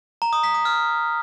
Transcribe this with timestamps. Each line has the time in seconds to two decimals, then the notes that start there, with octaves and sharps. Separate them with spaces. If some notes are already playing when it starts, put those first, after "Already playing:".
0.22 A#5
0.33 D#6
0.44 B6
0.54 D#6
0.65 F6